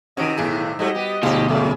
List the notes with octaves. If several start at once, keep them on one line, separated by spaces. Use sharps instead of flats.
C3 D#3 C#4 D#4 F#4 D#5 D7
B1 A2 G#4
G#2 G3 A3 F#4 D#5
B3 G4
D2 G#2 B2 F4 G4
F#2 C#3 A3 D5